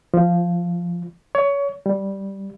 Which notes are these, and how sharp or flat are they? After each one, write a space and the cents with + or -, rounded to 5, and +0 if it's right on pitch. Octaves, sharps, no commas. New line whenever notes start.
F3 -5
C#5 +25
G3 -5